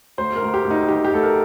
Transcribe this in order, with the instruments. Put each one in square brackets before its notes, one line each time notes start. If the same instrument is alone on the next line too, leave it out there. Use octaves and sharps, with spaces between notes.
[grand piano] D2 C5
A#4
D2
G4
D2
D#4
D#3 G4
G4
D2 A4
A#4